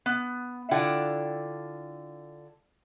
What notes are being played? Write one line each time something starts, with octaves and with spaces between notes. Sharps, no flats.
B3
D3 E4 F4 D5 F#5 G5